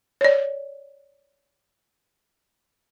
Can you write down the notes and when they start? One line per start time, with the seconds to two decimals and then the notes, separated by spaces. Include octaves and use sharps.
0.21 C#5 D5